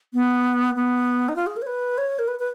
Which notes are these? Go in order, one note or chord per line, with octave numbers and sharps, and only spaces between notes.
B3
B3
D#4
F4
G#4
A#4
C#5
B4
C#5
A#4
B4
B4